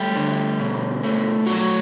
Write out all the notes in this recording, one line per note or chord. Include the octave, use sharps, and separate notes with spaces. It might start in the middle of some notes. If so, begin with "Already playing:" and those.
Already playing: G3 A3 G4
D3
B2
A3
F#3 F#4